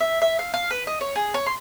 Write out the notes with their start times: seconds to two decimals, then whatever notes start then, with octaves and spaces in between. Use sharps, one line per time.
0.01 E5
0.22 E5
0.39 F5
0.54 F5
0.71 B4
0.87 D#5
1.01 C#5
1.16 G#4
1.34 C#5
1.46 C6